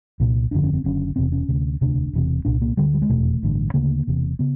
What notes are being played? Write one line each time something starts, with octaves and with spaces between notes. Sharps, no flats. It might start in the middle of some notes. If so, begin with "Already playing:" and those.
C2 A#2
G1 F2 D3 D4
C#4
C4
F#1 F#2 D3 C#4
E1 E2 C3 C4
C#4
D2 C3
E1 D2 C3 D4
E1 E2 C3
C2 A#2 D4
A#3
D2 D3 G3
G3
G#3
F1 E2 B2 A3
A1 G2 D3
D2 C#3 A#3
E1 E2 C3
C#3 B3